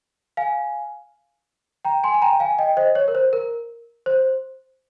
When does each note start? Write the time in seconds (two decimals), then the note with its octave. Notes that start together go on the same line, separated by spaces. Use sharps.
0.37 F5 G#5
1.85 G5 A#5
2.04 G#5 C6
2.14 G#5
2.22 G5 A#5
2.40 F5 G#5
2.59 D#5 G5
2.77 C5 D#5
2.95 C#5
3.08 A#4
3.15 C5
3.33 A#4
4.06 C5